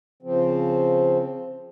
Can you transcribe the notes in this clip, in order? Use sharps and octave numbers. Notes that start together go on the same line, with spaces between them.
C#3 F3 C4